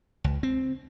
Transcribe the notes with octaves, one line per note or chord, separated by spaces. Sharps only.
C#2
C4